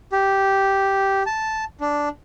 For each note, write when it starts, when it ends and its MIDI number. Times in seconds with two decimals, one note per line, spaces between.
0.12 1.23 67
1.26 1.64 81
1.81 2.09 62